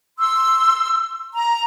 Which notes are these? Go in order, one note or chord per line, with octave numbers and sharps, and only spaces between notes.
C6 E6
A#5